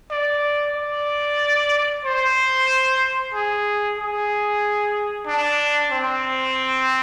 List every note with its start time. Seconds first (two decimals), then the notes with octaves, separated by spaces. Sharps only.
0.11 D5
0.76 D5
2.05 C5
3.34 G#4
3.99 G#4
5.27 D4
5.92 C4